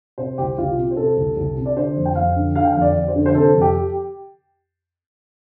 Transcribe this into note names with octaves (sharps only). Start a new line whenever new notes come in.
C3 C5
C2 G4
C2 F4
C3
C5
C3 A4
C2
C2
C3
D5
D3 C5
F2
G5
F2 F5
D3
D3 F5
G5
F2 F5
D5
F2
C5
D3
C5
C3 A4
F2
G4